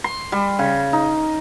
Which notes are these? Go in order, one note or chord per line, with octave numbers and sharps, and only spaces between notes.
C6
G3
C#3
D#4